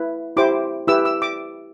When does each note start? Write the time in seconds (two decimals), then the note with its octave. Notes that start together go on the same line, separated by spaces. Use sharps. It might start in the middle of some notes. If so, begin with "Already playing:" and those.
Already playing: E4 B4
0.37 E4 G4 C5 D6
0.88 E4 G4 B4 E6
1.05 E6
1.22 D6